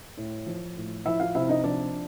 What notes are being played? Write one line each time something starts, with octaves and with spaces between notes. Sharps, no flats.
A2
F3
A2
F3 E4 E5
F4 F5
C3 E4 E5
D#4 D#5
F3 D4 D5